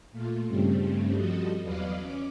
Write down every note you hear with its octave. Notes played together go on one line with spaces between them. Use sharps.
A#2 A3 F4
G2 C#3 G3 A3 C4
F3 G3 F#4 A4 D#5
E2 F#3 B4 D5 D#5 F5
C#4 D6